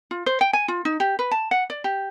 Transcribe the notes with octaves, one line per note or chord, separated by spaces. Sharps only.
F4
C5
G5
G#5
F4
D#4
G4
B4
A5
F#5
D5
G4